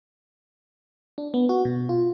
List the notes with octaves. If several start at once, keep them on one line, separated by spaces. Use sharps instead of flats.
D4
B3
F#4
B2
F4